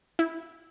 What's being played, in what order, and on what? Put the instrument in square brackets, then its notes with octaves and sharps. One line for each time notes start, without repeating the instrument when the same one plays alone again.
[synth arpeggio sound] E4